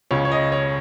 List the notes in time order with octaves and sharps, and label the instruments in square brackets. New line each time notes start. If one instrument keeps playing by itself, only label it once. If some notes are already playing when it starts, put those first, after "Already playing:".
[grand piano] C#2 C#3 C#5
C#5
D#5
C#5